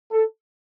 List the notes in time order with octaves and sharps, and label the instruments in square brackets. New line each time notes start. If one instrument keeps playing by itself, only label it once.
[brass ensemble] A4